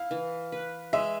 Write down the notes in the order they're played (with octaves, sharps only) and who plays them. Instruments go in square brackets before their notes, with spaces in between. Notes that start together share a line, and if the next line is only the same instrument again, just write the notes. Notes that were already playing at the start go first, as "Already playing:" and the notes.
Already playing: [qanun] E4 [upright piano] F5
[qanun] E3
B4
[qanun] G#3 [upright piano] E5